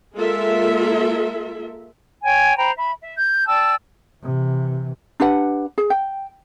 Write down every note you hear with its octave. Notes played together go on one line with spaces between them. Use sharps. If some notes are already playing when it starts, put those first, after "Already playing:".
G#3 A#3 F4 A4 A#4 E5
C#5 G5 G#5
C5 G5 A#5 B5
E5 B5
E5
G6
D5 G5 A5 E6
C3 E3
D4 G4 B4 F#5
G#4
G5